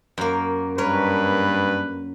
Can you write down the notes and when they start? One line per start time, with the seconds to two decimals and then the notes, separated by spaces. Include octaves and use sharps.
0.18 F#2 A#3
0.78 G2 A#4 B4 C#5